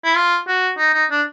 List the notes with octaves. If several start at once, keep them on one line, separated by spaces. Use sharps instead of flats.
E4
F4
F#4
D#4
D#4
D4